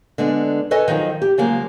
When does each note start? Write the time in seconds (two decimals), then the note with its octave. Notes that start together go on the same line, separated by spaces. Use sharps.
0.18 D3 G#3 B3 D4
0.71 A4 B4 C#5 D#5 G#5
0.88 D#3 F3 F#3 D#4
1.22 G4
1.38 C#3 F3 F#3 G#3 A#3